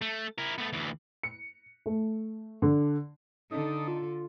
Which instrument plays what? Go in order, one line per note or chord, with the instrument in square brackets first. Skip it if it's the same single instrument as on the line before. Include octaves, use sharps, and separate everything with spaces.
[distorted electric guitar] A3
E4 A#4
A3 B3
D2 E3
[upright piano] C#7
A3
D3
[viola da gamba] D3 A4 [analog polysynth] D#4 [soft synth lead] D#6
[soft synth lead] F4